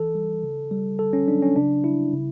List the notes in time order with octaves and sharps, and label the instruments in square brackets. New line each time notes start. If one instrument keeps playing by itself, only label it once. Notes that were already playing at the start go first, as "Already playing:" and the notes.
Already playing: [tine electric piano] E3 A4
G3
C#3
G3
D3 A4
C#4
F#3 D4
C#4
C#3 D4
G3 E4
C#3